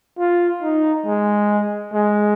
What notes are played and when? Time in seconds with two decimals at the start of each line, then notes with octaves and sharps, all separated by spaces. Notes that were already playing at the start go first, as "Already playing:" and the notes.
0.18 F4
0.62 D#4
1.06 G#3
1.93 G#3